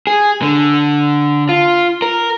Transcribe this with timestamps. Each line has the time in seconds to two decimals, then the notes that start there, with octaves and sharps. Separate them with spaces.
0.07 G#4
0.42 D3
1.49 F4
2.02 A#4